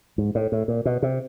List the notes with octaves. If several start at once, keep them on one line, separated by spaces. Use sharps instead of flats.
G#2
A2
A2
A#2
B2
C3